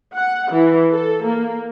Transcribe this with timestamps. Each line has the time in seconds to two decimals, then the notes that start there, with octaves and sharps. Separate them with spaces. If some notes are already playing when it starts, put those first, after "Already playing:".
0.14 F#5
0.51 E3
0.92 A4
1.25 A#3